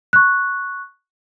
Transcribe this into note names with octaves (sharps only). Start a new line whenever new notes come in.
C#6 F#6